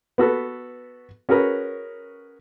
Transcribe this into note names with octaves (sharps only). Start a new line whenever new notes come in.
B3 F#4 A4 B4
C#4 F#4 G#4 A#4 B4